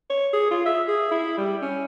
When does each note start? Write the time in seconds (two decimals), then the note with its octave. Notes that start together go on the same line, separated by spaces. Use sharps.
0.10 C#5
0.33 G#4
0.51 F4
0.66 E5
0.88 G#4
1.11 E4
1.38 G3
1.62 C#4